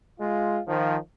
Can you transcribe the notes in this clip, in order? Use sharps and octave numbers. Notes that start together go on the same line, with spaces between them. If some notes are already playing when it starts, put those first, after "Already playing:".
G#3 F4
D#3 F3